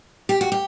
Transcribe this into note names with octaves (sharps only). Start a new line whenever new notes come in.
G4
F#4
G4